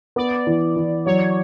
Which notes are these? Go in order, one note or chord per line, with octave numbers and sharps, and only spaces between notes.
B3 D5
E3
E3
F#3 C#5